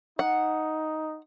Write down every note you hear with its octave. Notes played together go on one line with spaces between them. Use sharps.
D#4 F#5